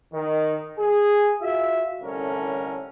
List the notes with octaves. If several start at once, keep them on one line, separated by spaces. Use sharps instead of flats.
D#3
G#4
F4 F#4 E5
C2 A2 D3 C#4 A#4